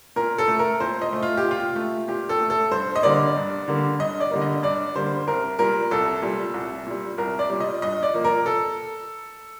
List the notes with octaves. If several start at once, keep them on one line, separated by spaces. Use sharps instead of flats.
A#2 A#4
A4
A3
A#4
A#2 C5
D#5
A3
F4
G4
A#2
F4
A3
A#2 G4
A4
A3
A4
G2 C5
D#5
D3 G3 A#3 D5
G2
D3 G3 A#3
G2 D#5
D5
D3 G3 A#3
D#5
G2 D5
D3 G3 A#3 C5
C2 A#4
A#2 G3 A#4
C2 A4
A#2 G3
C2
A#2 G3
C2 A#4
D5
A#2 G3
D#5
G2 D#5
D5
F3 A#3
A#4
A4